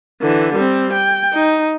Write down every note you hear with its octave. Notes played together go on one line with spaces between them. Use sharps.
D3 E3
G3 C4
G5
D#4